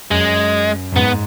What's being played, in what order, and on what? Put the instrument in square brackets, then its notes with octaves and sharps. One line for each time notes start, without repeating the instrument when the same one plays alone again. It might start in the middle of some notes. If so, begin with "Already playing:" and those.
[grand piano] F#2 [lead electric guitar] G#3
[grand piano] F#2
[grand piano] G#2 [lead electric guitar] B3